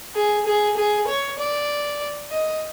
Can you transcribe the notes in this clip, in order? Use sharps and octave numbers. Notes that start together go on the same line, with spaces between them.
G#4
G#4
G#4
C#5
D5
D#5